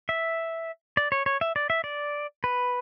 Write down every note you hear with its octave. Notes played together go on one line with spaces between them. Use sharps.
E5
D5
C#5
C#5
E5
D5
E5
D5
B4